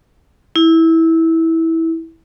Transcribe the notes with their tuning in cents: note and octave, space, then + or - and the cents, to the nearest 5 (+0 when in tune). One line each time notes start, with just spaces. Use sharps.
E4 -15